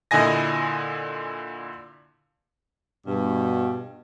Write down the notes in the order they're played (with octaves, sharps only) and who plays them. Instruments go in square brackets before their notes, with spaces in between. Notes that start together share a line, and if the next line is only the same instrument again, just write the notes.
[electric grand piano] A#2 D3 E4 D#5 G#5 A#6
[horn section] G2 B2